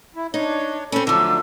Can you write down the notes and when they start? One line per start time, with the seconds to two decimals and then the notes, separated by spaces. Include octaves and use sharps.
0.16 E4
0.34 D4 D#4 C#5
0.92 C4 C#4 A4 B5
1.07 D3 F3 F#3 A3 D4 D6 E6